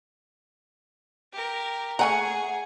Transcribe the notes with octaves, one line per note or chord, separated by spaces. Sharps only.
G4 A#4
A3 G#4 F#5 G#5 A#5